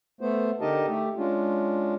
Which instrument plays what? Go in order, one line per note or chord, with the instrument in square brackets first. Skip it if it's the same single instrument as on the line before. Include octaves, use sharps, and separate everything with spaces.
[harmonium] A3 B3 C5
D3 D#4 G4 A#4 D#5 A5
A3 G4
G#3 C#4 D4 F4